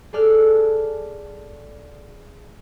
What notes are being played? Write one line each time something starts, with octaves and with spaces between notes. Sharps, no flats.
G#4 A4 D5 F6 F#6